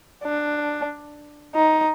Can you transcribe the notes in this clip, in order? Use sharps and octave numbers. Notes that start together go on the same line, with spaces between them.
D4
D#4